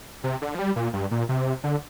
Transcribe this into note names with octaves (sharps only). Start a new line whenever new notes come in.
C3
D3
F3
G3
A#2
G2
A#2
C3
D3